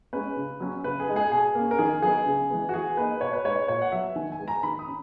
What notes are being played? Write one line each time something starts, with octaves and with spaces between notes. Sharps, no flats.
G#3 C#4 B4
C#3
F#3 C#4
C#3 B4
G#4
G#3 D#4
G#4
B2 G#4
A#3 C#4
A#4
D#3 G#4
F#3 B3 D#4 G#4
C#3
E3 G#3 B3
F#4
E3 G#4
A#3 D#4 B4
B2 C#5
B4
G#3 D#4 C#5
A#2 C#5
F#5
F#3 B3 E5
D#3 G#5
G#5
G#3 B3
A#5
D#3 B5
D#6
C#4